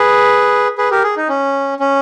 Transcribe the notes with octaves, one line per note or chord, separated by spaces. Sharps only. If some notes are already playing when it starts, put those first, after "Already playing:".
Already playing: G#4 B4
G#4 B4
G4 A#4
G#4
D#4
C#4
C#4